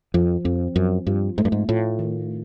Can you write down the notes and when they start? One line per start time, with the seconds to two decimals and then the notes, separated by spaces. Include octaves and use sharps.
0.14 F2 F3
0.45 F2 C4
0.75 F#2 F3
1.07 G2 F4
1.38 G#2 A3
1.45 G2
1.52 G#2
1.69 A2 F4
1.99 D#3